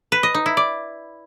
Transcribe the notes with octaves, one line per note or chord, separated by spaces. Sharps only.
B4
D#5
D#4
E4
D5